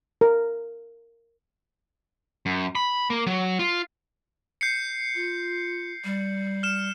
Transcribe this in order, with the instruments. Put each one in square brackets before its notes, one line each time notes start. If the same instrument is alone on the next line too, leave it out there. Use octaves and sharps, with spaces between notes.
[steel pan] A#4
[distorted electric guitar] F#2
B5
A#3
F#3
F4
[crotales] G6 C7 C#7
[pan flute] F4
G3
[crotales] F6 E7